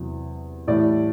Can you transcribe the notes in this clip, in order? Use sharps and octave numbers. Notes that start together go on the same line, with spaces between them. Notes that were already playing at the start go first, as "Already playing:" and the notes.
Already playing: E2 C3 F#3
A2 E3 G3 D5